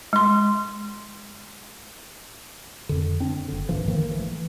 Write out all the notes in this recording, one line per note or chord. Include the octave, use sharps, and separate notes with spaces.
G#3 C6
F2 D3
C4 D4
F#1 D3
A#1 G2 E3 F3
D3 D#3 F3 A#3
E3 A3